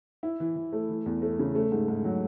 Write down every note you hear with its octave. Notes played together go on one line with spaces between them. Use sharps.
E4
E3
E3
A3
E3
E2
A3
C#3
A3
G#2
G#2
F#3